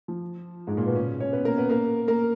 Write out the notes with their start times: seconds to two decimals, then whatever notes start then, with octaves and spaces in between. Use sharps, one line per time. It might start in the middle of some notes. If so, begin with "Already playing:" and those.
0.08 F3
0.67 G#2 G#3
0.77 A#2 A#3
0.86 B2 B3
0.95 C#3 C#4
1.20 C#4 C#5
1.33 B3 B4
1.45 A#3 A#4
1.58 B3 B4
1.70 A#3 A#4
2.08 A#3 A#4